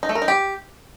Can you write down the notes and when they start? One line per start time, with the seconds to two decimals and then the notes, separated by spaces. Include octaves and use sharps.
0.03 D#4
0.09 A3
0.15 A#4
0.22 D#4
0.28 G4